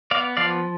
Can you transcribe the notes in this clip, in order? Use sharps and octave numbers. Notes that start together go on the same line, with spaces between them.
B3 D5 F5
F3 D5 F5